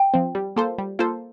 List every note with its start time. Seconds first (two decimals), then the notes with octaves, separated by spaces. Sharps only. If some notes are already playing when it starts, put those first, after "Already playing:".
Already playing: G5
0.14 F3 C4
0.35 G3
0.56 A#3 F4 A4 C5
0.78 G3
0.99 A#3 F4 A4 C5